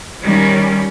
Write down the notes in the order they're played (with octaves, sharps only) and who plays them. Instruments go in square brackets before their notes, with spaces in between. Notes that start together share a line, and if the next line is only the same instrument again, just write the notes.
[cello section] D#3 G3 C#4